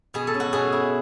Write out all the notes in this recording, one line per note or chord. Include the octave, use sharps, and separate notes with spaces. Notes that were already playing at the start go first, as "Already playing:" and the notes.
B2 G#4
A4
C#4
F#4
B2 G#4
E4